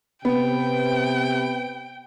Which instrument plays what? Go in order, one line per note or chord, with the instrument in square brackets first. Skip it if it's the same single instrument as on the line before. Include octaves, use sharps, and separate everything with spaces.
[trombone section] C3 [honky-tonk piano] B3 [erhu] G5